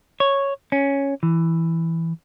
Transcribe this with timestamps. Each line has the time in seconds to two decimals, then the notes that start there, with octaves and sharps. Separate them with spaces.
0.20 C#5
0.72 C#4
1.23 E3